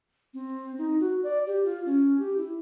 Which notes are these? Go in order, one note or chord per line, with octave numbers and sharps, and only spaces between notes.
C4
D#4
F#4
D5
G4
F4
C#4
G4
E4